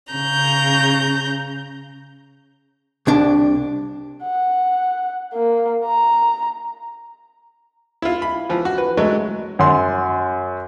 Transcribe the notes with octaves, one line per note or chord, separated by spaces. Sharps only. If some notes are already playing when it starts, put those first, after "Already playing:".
C#3 A#5 G6
C2 D4
F#5
A#3
A#5
E4 F4
B5
E3 F3
F#4
B4
F#3 G#3 A3
F#2 C6